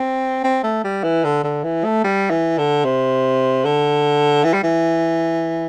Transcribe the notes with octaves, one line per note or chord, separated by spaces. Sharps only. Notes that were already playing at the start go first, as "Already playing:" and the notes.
Already playing: C4
C4
A3
G3
E3
D3
D3
E3
A3
G3
E3
D3
C3
D3
E3
G3
E3